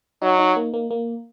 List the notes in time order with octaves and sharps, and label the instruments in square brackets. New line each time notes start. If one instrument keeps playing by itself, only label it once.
[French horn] F#3 [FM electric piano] D#4
[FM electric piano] D#4
A#3
A#3
A#3